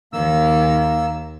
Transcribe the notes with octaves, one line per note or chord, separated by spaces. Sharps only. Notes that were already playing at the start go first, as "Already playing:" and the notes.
D#2 D#3 A#3 E6